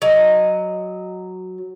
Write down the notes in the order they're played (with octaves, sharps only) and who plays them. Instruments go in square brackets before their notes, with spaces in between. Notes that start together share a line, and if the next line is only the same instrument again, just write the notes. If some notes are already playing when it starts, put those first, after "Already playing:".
[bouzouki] F#3 D#5